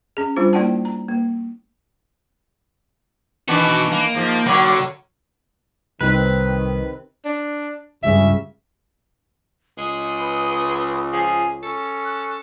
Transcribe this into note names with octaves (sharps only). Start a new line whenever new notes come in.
C#4 G#4
G3 B3 D4 F4 C5
A#3 E4 D5 F#5 G5 A5
A#5
A#3
B2 D#3 E3 D4 F#4
A#3
G#2 F3
D3 F#3 A#3 C#5
C2 C3 D#3 C4 D#4 B4
D4
C#2 G2 C#3 E5
C#2 G#3 D#6
B4
F3 G#4
C#4 A4
F#6